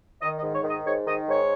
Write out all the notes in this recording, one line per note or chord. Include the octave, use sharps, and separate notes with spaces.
D#3 D#5
D#5
G#2
C#5
D#3
D#5
G#2 C#5
D#3 D#5
G#2 C#5